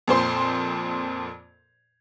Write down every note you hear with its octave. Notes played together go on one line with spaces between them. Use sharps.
F2 A#2 C5 C6